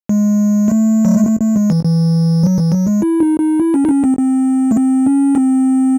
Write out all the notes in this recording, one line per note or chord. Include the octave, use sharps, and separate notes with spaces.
G#3
A3
F#3
G#3
A3
A3
G#3
E3
E3
F#3
E3
F#3
G#3
E4
D#4
D#4
E4
C#4
D#4
C#4
C4
C4
A3
C4
C#4
C4